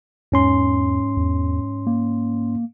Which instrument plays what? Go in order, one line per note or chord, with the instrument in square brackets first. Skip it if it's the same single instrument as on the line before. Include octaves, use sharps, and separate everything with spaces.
[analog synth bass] E2 [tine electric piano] G#2 C#4 C6
[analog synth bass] E2
A#3